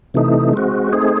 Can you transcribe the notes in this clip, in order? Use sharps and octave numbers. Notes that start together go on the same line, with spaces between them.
C3 E3 A3 D#4
G#3 C4 F#4
A3 C4 D#4 G#4